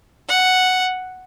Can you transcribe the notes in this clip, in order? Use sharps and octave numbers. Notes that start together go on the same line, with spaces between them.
F#5